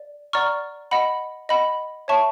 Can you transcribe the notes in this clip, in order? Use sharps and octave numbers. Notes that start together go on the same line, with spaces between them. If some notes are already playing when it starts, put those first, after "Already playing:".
Already playing: D5
D5 F#5 A#5 C#6 F6
D#5 F#5 B5
D#5 F#5 B5
C#5 E5 A5 C#6